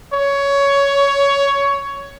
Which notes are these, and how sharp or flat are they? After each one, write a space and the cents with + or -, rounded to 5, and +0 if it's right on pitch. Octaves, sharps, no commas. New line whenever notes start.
C#5 +15